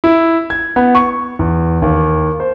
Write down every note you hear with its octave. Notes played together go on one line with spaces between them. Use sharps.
E4
G#6
B3
C#6
E2
D#2
C5